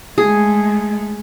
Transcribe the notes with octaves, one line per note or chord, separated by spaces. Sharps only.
G#3 A3 G#4